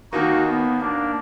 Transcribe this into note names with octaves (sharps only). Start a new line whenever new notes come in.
D#2 D#3 A#3 D#4 F#4
B3
A#3 D4